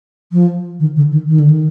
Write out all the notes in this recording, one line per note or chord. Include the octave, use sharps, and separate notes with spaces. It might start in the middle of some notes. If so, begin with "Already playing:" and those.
F3
D#3
D3
D#3
D#3
D3
D#3